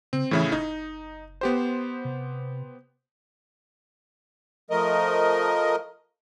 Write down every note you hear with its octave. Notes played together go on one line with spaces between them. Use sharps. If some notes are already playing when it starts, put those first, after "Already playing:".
C#3 C4
A2 C#3 E3 E4
F#1 D#4
B3 G4 C5
C3
F3 A3 A#4 D#5